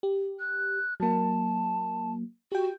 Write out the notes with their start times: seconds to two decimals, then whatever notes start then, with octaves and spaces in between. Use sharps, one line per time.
0.03 G4
0.39 F#6
1.00 F#3 A#3 A5
2.52 F#4 G4 G5